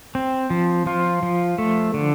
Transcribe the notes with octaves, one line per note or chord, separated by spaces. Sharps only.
C4
F3
F3 F4
F3
A3
D3